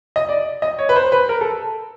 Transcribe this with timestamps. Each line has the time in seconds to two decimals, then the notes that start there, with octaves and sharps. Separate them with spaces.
0.16 D#5
0.29 D5
0.62 D#5
0.79 C#5
0.89 B4
0.96 C5
1.12 B4
1.29 A#4
1.41 A4